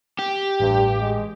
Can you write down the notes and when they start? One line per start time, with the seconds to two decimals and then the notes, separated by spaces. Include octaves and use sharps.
0.19 G4
0.60 A1 G2
1.00 G#3